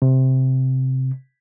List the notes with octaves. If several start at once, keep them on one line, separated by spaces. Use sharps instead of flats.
C3